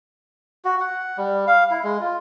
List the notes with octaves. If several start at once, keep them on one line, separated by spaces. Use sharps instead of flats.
F#4
F#5
G3
F5
E4
G#3
F4